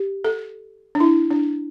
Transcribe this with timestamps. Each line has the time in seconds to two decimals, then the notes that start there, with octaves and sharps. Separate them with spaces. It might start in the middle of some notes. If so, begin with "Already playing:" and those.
Already playing: G4
0.24 A4
0.95 D4
1.00 E4
1.31 D4